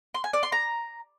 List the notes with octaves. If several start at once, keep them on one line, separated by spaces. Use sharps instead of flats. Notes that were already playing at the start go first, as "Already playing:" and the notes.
C6
G#5
D5
C6
A#5